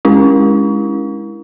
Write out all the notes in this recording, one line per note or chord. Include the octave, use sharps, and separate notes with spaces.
G#3 C#4 E4